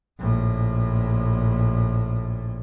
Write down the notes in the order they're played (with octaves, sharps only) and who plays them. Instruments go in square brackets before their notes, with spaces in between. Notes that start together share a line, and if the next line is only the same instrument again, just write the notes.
[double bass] A#1 A2